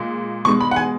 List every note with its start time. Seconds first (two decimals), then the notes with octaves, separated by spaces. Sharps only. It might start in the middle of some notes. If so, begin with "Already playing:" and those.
Already playing: A#2 G#3
0.45 B2 G#3 C#6
0.61 B5
0.71 F#5
0.76 G#5